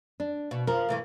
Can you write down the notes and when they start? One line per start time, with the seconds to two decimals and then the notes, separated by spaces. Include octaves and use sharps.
0.20 D4
0.51 B2
0.67 F3 A#4
0.89 G2 E3 A3